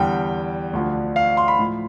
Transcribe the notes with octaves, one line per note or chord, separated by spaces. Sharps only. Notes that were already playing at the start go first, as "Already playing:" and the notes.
Already playing: E2 D3 G3 G5
D2 D3 F3
F5
C6
B5
A2 F3